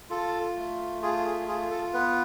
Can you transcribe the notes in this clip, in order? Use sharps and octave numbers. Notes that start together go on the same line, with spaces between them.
F4 A4
A3
F4 G#4
G#4
F4 G#4
A4
B3 B4